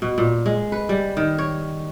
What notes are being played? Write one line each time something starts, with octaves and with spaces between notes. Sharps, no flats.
B2
A#2
G#3
B4
G3
D#3
C#5